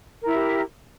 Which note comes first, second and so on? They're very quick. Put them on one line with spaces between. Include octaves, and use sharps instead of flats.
A#4 E4 E5 G4